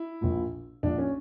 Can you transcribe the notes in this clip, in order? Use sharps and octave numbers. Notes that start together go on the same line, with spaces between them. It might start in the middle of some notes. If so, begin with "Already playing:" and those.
Already playing: E4
A#1 A#2 F3
A#1 A#2 F3 D4
C#4